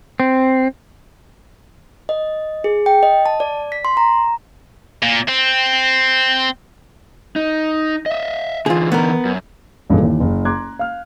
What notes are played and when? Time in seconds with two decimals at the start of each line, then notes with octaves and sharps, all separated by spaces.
0.20 C4
2.09 D#5
2.64 G#4
2.86 G5
3.03 D#5
3.26 A5
3.40 D5
3.72 B6
3.85 C6
3.97 A#5
5.02 A#2
5.28 C4
7.36 D#4
8.06 D#5 E5
8.66 D3 E3 F4 G#4
8.92 B3 A#4
9.25 F#2
9.90 A1 G2 A#2 D#3 G#3 A4
10.01 D#2 E3
10.20 F#1
10.45 A#5 C6 D6 F#6 G#6
10.79 F5 F6